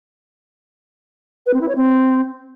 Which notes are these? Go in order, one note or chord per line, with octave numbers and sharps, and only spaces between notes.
B4
C4
E4
C#5
C4